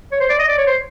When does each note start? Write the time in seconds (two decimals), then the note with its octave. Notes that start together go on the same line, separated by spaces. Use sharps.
0.12 C#5
0.20 C5
0.29 D5
0.39 D#5
0.48 D5
0.58 C#5
0.67 C5